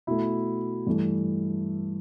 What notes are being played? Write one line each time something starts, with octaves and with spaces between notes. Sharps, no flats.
B2 A3 E4
G2 E3 A3